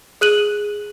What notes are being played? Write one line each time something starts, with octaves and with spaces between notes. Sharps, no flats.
G#4 F#6 D#7 F#7